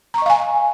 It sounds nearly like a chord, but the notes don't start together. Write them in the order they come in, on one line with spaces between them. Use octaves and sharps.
A#5 C#6 D#5 F5 G#5